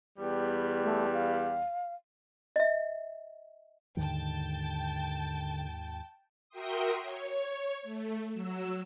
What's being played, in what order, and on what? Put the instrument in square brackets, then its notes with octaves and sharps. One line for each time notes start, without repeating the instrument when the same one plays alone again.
[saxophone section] E2 G3
[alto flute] A3
F5
[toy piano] D#5 E5
[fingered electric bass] D#2 G#2 D#3 [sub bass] D3 [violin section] G5 A5
[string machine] F#4 A#4 E5 G5 C6 D#6
C#5
A3
F#3 E6